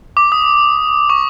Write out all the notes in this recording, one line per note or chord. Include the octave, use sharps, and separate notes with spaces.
D6
D#6
C#6